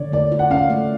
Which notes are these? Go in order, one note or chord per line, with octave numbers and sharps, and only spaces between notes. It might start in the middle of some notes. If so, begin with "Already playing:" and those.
Already playing: D3 C#5 D5
A3 D5
F4
F#5
C#4 F5
A3